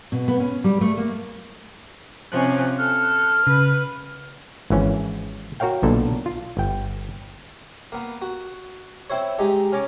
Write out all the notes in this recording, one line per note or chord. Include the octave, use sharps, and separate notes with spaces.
B2
B3
C#4
G3
A3
A#3
C3 F3 C#4 F#6
A4 F6
C#3 B4
G#1 E3 C#4
F#4 A#4 C#5 F5 G5
B1 A#2 D3 A4
F4
G1 G5
A#3 B3
F#4
C4 E4 C5 C#5
G#3 D#4 G4
C#4 C#5 A#5 D6